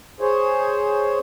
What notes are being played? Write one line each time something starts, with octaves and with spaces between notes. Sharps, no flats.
G#4 C5 C#5